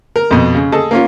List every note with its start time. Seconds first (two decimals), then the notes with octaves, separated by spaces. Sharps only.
0.16 A#4
0.31 F2 B2
0.55 C#3
0.72 G#4 A4 D#5 A5
0.91 A#3 C#4 F4